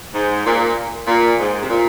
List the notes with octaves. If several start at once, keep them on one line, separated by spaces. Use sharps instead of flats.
G#2
A#2
A#2
G#2
C3
A#2